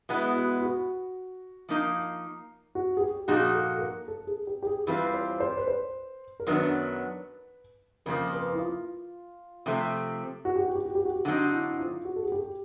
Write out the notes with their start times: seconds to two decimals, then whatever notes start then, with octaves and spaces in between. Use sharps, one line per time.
0.09 B2 G#3 B3 E4
0.36 F#4
0.62 F#4
1.69 F3 A#3 D#4
2.75 F#4
2.97 G#4
3.01 G4
3.28 A#2 F3 A#3 D#4 F#4 G#4
3.55 A4
3.76 A4
3.81 A#4
4.08 A4
4.27 G#4
4.47 G4
4.63 G4
4.67 G#4
4.87 E3 G3 C4 F4 B4
5.14 C5
5.40 C5
5.57 B4
5.68 C5
6.40 A#4
6.47 F#2 D#3 F#3 B3 D4 B4
8.06 F2 C#3 F3 A#3 A#4
8.33 B4
8.53 E4
8.59 F4
9.66 C3 F3 A3 C4
10.45 F#4
10.56 G4
10.65 F#4
10.75 G4
10.85 F#4
10.95 G4
11.05 F#4
11.16 G4
11.25 D3 F#3 A3 C4 D#4 F#4
11.51 E4
11.79 F4
12.05 F#4
12.16 A4
12.23 G#4
12.32 G4